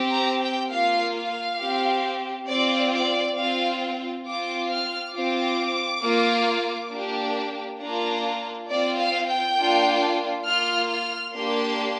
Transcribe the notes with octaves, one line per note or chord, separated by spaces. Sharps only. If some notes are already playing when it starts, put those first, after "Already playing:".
Already playing: C4 G4
A#5
G5
A#3 F4 F5
F5
C4 G4
C4 F4 D5
D5
C4 F4 F5
C4 F4 D6
F6
C4 F4 D6
A#3 F4
A#3 D4 G4
A#3 D4 F4 A#5
C4 F4 D5
F5
G5
A#3 D4 F4
A#3 F4 F6
F6
A#3 D4 G4 C6